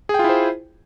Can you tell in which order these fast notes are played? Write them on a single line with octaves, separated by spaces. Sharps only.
G#4 G5 F4 E4 C5